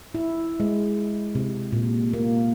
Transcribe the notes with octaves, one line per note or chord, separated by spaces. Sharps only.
E4
G#3
C3
A#2
A#3